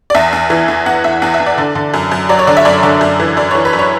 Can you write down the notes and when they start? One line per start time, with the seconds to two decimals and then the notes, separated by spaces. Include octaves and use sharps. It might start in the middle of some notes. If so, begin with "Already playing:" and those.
0.10 D5
0.15 E2 E5
0.33 E2
0.50 E3
0.68 E2
0.86 E2 F#5
1.04 E2 E5
1.22 E2 F#5
1.34 E5
1.40 E2
1.46 D5
1.58 D3
1.75 D3
1.94 F#2
2.12 F#2
2.29 F#3 D5
2.39 C#5
2.47 D3 D5
2.57 E5
2.65 F#2 D5
2.83 D3
3.01 F#2
3.20 E3
3.37 F#2 D5
3.51 E3 C#5
3.65 B4
3.73 F#2
3.79 C#5